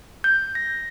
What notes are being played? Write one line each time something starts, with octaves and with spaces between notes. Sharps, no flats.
G6
A#6